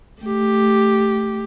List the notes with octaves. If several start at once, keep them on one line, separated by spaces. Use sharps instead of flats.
A3 G4